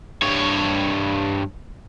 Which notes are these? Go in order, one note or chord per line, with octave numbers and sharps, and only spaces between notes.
G2 C#5